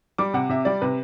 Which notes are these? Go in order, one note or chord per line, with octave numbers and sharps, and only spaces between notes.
G3 D6
C3 F#5
C3 E5
G3 D5
C3 B4